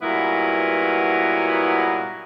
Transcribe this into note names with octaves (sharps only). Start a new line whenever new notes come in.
G2 A#2 F#3 B3 E4 A#4